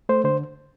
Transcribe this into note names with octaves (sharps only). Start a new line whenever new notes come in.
A3 C5
D3 C5